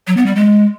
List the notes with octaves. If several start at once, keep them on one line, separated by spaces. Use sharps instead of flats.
F#3
B3
G3
G#3